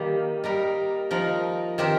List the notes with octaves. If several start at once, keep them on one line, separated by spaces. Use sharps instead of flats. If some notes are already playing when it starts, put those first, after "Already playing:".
Already playing: D#3 G3 A#3
G3 D#4 A#4
F3 D#4 A#4
D#3 C4 G4 A#4